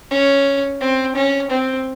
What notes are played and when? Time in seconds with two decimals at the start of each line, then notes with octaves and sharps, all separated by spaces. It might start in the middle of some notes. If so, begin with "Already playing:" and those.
0.10 C#4
0.81 C4
1.15 C#4
1.50 C4